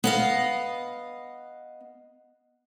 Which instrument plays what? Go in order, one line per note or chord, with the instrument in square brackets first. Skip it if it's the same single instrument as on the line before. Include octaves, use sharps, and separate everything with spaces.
[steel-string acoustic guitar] B3 D#5 F5